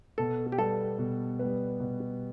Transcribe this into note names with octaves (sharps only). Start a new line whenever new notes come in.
B2 A4
G4
G3 B3 A4
B2
G3 B3
B2